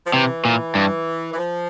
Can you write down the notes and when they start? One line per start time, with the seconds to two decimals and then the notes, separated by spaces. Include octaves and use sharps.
0.05 F3
0.13 C3 E3
0.45 A#2
0.75 G2
1.33 E3
1.37 F3